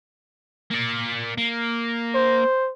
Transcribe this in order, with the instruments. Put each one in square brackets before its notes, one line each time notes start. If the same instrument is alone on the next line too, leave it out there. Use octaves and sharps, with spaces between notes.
[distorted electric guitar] A#3 D5
A#3
[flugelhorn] C5